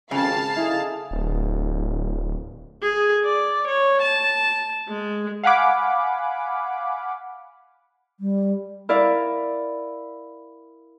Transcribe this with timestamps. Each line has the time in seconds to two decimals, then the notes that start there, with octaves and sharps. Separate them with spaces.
0.11 G#1 F2 C#3 G4 F5 G#5 A5
0.56 D#4 E4 G#4 A4
1.11 D1
2.82 G#4
3.24 D5
3.67 C#5
4.02 A5
4.88 G#3
5.44 F5 F#5 G#5 B5 D6
8.20 G3
8.89 E4 A#4 D5 F5